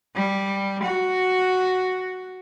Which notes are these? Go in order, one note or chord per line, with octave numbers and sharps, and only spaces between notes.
G3
F#4